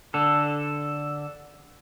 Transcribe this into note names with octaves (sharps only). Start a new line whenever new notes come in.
D3 A4